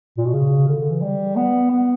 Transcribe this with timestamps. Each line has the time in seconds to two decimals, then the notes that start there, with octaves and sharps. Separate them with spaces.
0.18 A#2
0.25 B2
0.33 C#3
0.68 D3
0.79 D3
0.90 E3
1.02 G3
1.36 B3
1.71 B3